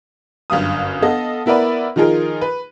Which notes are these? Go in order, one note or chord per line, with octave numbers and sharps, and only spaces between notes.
G1 F#2 F5 D#6
B3 A4 D#5 F5
B3 E4 A#4 B4 D5 B5
D#3 F3 D#4 F4 G#4 A#4
B4